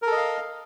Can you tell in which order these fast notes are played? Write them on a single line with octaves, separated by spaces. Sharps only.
A#4 A4 D#5 F5